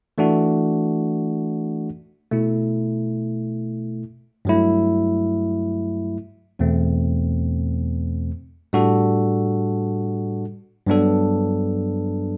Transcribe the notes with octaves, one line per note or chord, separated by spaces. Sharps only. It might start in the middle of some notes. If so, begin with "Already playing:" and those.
E3 A3 D4 F#4
B2 A3 E4
G2 F#3 A3 E4
E2 B2 A3 C4
A2 G3 D4 F#4 A4
G2 F#3 B3 D4 A4